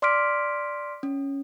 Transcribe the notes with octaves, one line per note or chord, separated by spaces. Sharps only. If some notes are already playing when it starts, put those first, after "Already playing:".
D5 C6 D6 F6 B6 D7
C#4